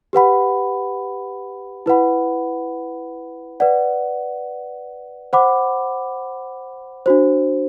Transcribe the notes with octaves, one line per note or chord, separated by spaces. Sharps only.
G4 B4 F#5 B5
E4 B4 F#5 B5
B4 D5 F#5
C5 F#5 B5 D6
D4 F#4 C5